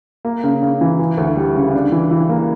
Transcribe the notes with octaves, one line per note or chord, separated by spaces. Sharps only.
A#3
C#3
C#3
E3
E3
D2
G3
C#3
D4
E3
E3
A#3